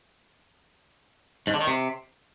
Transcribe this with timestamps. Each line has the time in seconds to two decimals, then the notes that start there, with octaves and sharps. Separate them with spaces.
1.47 G#2
1.54 D3
1.61 D#3
1.67 C3